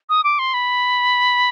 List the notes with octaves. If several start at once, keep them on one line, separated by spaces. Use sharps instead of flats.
D#6
D6
C6
B5